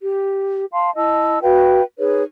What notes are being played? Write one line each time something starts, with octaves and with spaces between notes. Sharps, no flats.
G4
F5 A5 C6
E4 D#5 A5 E6
F#4 B4 F5 G5
D#4 G#4 B4 C#5